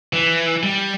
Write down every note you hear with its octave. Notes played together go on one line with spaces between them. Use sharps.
E3
G3